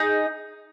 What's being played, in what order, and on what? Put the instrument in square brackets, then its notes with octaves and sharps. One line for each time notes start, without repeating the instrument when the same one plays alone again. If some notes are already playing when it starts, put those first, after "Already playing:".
Already playing: [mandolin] D#4 G#4